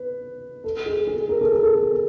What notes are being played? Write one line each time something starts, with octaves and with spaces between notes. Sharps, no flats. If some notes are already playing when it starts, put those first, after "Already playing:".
Already playing: B4
A4
G#4
G#4
A#4
A4
G#4
A4